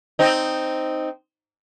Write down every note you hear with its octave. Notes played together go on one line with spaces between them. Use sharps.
C4 D#4